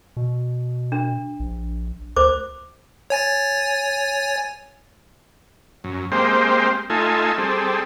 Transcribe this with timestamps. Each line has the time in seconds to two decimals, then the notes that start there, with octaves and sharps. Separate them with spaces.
0.17 B2
0.92 D4
1.40 A#1
2.16 D2 C5 D6
3.10 C#5 G#5 A6
5.84 F#2
6.12 G#3 A#3 C4 G4 C5
6.90 A3 D#4 F4 A4 G#5
7.38 G3 C4 G#4 A4